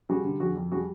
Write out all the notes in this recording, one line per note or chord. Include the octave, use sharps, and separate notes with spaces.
G3 F#4 G#4
D3
F2 F#4 G#4
F2
G3 F#4 G#4